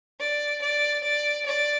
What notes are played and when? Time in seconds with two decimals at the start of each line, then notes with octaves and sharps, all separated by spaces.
0.20 D5
0.62 D5
1.03 D5
1.46 D5